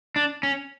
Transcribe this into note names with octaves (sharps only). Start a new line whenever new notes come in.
D4
C#4